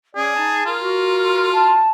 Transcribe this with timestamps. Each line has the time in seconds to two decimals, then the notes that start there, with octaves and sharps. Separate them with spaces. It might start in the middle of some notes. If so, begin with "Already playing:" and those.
0.15 C#4 G#4 D5
0.36 D#4 A5
0.65 F4 A#4
0.82 F#4
1.52 A5